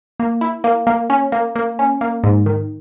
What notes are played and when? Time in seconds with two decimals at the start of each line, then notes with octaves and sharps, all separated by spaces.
0.20 A#3
0.41 E4
0.64 A#3
0.87 A#3
1.10 C#4
1.32 A#3
1.56 A#3
1.79 C#4
2.01 A#3
2.24 G#2
2.46 D#3